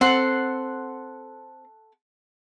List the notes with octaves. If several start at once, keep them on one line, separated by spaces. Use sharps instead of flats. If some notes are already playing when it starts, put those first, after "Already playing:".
C4 A4 F#5 C6